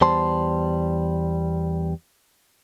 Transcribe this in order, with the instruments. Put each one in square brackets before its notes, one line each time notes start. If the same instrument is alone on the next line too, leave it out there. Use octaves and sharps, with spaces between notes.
[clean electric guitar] E2 G3 C5 A5 C6